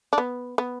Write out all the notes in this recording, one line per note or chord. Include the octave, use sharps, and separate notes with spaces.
D4
B3
B3